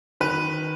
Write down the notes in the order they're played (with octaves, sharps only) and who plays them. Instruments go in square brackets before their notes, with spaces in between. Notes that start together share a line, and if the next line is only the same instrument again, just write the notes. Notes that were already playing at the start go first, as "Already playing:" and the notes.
[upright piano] D#3 B4